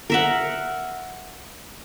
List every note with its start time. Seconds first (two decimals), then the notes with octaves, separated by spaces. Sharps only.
0.10 A#4 E5 F#5